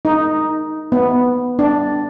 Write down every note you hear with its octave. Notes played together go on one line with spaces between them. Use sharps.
D#4
B3
D4